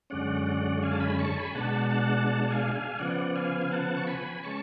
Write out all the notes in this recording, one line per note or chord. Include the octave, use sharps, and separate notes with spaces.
F#2 D3 G#3 C#4 D5 F#5
D5 F#5
F5 G#5
A5
G#5 B5
A5 C#6
G#5 B5
B2 G#3 D4 F#5 A5
F#5 A5
F#5 A5
F#5
F5 G#5
F5 G#5
G#5
C#3 F3 B3 D5 F#5
F5 G#5
G#5
F#5 A5
C#6
G#5 B5
G#3 C#4 A5 C#6